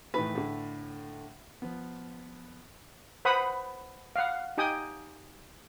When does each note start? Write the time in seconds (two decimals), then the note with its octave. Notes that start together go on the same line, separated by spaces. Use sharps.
0.14 A2 D#3 E3 B4
0.35 A2 D3
1.62 F3 B3
3.25 B4 C5 F#5 B5 D#6
4.16 F5 F#5
4.58 D#4 G4 G5 G#5 D#6